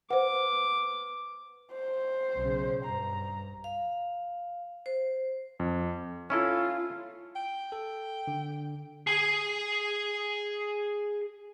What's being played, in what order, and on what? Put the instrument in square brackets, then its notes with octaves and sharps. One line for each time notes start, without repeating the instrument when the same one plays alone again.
[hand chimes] B4 [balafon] C5 F#5 [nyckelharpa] D6
[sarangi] C5
[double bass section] B1 C#3
[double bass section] G2 [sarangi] A#5
[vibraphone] F5
C5
[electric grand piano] F2
[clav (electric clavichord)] C#4 E4 A4 [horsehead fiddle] F4
[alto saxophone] G5
[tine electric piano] A4
D3
[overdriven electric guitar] G#4 G#5